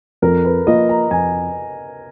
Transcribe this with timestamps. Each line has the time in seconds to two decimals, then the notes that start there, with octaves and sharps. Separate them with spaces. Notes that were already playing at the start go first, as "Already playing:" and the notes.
0.22 F2 A#4
0.45 B4
0.67 F3 A#3 F4 A#4 D#5
0.89 A#5
1.11 F2 G#5